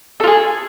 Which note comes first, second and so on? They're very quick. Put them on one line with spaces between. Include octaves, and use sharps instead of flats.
A4 F4 G#4